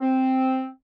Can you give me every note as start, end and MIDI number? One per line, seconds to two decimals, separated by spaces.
0.01 0.66 60